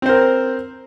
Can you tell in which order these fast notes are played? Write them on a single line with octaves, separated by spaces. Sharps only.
C4 C5 A#4